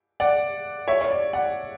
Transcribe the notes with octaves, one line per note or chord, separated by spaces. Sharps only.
D5 F#5
C#5 E5
C#5
D5
D5 F#5